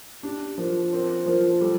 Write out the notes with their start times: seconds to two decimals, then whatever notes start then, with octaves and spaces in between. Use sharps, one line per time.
0.23 D4 G4
0.58 F3 A#4
0.92 C4 A#4
1.26 F3 A#4
1.61 G3 A4